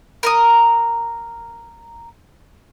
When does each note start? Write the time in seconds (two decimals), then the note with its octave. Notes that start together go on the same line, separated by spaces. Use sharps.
0.23 A#4 A#5 D#6